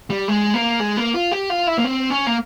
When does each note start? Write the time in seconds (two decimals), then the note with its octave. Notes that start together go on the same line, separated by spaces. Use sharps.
0.10 G3
0.28 G#3
0.54 A#3
0.80 G#3
0.97 A#3
1.14 F4
1.31 G4
1.50 F4
1.67 E4
1.78 A#3
1.84 C4
2.10 C#4
2.27 A#3